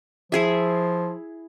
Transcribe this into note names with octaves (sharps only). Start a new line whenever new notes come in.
F3 E4 G#4 E5